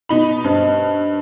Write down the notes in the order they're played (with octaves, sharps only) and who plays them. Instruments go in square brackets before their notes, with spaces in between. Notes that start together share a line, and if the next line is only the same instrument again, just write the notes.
[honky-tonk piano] B2 D#4 B5
[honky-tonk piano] G2 [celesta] C5 D#5 A5